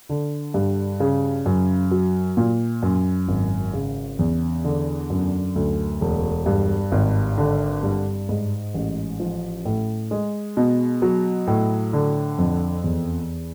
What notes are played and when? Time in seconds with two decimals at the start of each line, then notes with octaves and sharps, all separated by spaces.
0.09 D3
0.54 G2
1.00 C#3
1.46 F#2
1.91 F#3
2.37 A#2
2.83 F#2
3.28 G#1
3.73 C#3
4.19 E2
4.65 D3
5.10 F#2
5.56 D2
6.01 E1
6.46 G2
6.92 G#1
7.38 D3
7.83 G2
8.29 G#2
8.74 A1
9.20 F3
9.65 A2
10.11 G#3
10.57 B2
11.02 F#3
11.47 A2
11.93 D3
12.38 F2
12.84 E2